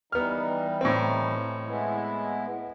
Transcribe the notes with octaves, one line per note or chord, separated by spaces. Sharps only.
E3 G3 B3 D#4 F6
A2 C4
G#3 B3 E4